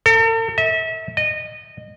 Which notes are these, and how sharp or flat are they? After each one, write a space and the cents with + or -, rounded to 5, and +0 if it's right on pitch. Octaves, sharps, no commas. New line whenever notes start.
A4 +45
E5 -35
D#5 -20